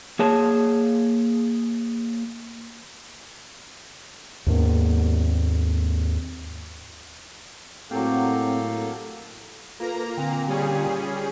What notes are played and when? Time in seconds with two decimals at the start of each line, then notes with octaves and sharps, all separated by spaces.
0.19 A#3 G#4 C#5 A5
4.46 D#2 G#2 A#3 B3
7.91 A2 F#3 A#3 C4 G4 A4 F5
9.80 A#3 F4 A4 B4 A#5
10.18 A#2 D3 C4 G5
10.48 G3 C#4 G4 G#4